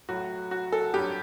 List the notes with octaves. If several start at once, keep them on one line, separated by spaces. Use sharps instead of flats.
A2 F#3 F#4
F#4
A4
G2 F#3 G4